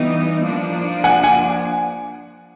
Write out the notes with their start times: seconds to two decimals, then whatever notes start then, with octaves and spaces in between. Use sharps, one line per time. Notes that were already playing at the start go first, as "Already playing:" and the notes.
Already playing: E3 G3 B3 D#4
0.45 F3 A#3 D4
1.04 F#5 G#5
1.23 F#5 G#5